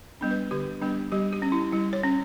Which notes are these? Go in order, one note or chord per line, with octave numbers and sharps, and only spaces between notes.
G3 B3 D4
B4
D3 G4
G3 B3 D4
G3 G4
G4
C#4
E4
G3 E4
C#5
C#4